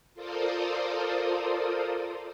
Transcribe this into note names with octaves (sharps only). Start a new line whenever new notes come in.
F4 A4 A#4 C5 D5 D#6